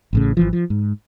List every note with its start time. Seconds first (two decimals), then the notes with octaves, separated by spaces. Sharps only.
0.13 A1 A2 C#3
0.37 G#1 E3 F3
0.53 F3
0.70 G#2